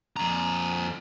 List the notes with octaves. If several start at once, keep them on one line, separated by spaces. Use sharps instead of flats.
F2 A#5